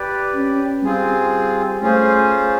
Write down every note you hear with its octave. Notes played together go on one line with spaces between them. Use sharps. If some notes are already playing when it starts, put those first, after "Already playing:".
Already playing: G4 B4 D5
C#4
G3 C4 F4 G#4
A3 C#4 F4 G#4 C5